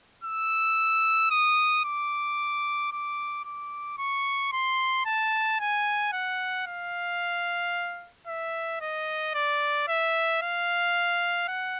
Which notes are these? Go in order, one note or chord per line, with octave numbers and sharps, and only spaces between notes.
E6
D#6
D6
D6
D6
C#6
C6
A5
G#5
F#5
F5
E5
D#5
D5
E5
F5
F#5